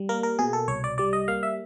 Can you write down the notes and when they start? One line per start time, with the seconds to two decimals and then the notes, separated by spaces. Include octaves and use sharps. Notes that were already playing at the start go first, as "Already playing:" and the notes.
Already playing: G3
0.09 A#3 A#4
0.23 A#4
0.39 B2 G#4
0.53 A4
0.68 C2 C#5
0.84 D5
0.98 G3 D5
1.13 D#5
1.28 A#3 F5
1.43 E5